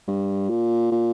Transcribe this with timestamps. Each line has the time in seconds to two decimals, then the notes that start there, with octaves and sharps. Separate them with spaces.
0.08 G2
0.50 A#2
0.91 A#2